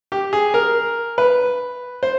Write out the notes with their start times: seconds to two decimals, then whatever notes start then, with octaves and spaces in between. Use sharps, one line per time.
0.12 G4
0.33 G#4
0.54 A#4
1.18 B4
2.03 C5